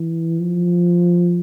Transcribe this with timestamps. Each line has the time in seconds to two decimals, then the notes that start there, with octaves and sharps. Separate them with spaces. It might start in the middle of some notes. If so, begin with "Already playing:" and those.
Already playing: E3
0.40 F3